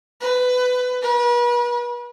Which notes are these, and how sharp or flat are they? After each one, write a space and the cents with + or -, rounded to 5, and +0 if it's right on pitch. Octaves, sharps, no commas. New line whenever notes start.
B4 +20
B4 -40